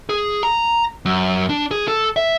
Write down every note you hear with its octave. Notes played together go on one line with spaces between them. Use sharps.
G#4
A#5
F#2
D4
G#4
A4
E5